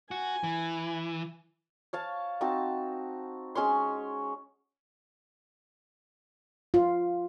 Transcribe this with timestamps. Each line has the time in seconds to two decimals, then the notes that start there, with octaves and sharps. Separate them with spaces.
0.11 F#4 G#5
0.43 E3
1.93 C#5 F5 A5
2.41 C4 D#4 F#4 A5
3.55 G#3 C#4 C#5 C6
6.74 F4